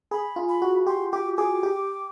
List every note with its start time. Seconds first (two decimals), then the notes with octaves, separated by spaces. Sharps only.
0.11 G#4 B5
0.36 F4
0.49 B5
0.62 F#4
0.87 G4 C6
1.12 G4 D6
1.37 G#4 D6
1.63 G4